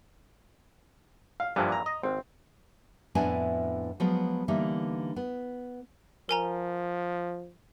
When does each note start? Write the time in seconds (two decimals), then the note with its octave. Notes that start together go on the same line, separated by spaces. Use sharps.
1.40 F5
1.56 G2 A#2 D3 E3 F3
1.72 A#5
1.86 D#5
2.03 G#1 C4
3.15 F2 A2 B3 D4 E4 G#5
4.00 F3 F#3 G#3 B3
4.48 D3 E3 G3 A#3 D#4
5.16 B3
6.29 F3 A#4 G#5 A#5